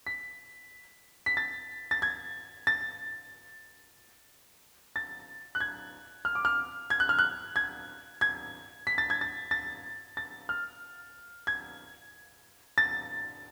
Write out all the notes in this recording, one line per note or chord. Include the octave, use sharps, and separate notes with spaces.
B6
B6
A6
A6
G#6
A6
A6
F#6
G#6
F6
D6
F6
G#6
F#6
F6
F#6
G#6
G#6
B6
A6
G#6
A6
A6
A6
F6
G#6
A6